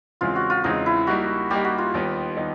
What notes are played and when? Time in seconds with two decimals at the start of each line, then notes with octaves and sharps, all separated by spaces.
0.21 E2 C#3 E3 G#3 C4 F4
0.36 F#4
0.50 F4
0.64 E2 C#3 E3 G#3 C4 D#4
0.86 E4
1.07 G3 A#3 D#4 F#4
1.50 G3 A#3 D#4 G4
1.65 F#4
1.78 F4
1.94 D#2 D#3 G3 B3 D#4
2.37 D#3 G3 B3 D#4